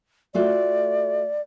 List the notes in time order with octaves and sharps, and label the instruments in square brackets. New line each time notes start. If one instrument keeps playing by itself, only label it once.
[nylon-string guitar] A3 F4 F#4 [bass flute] D5